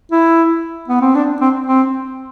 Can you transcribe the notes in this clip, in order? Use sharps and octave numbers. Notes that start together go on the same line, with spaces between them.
E4
B3
C4
D4
C4
C4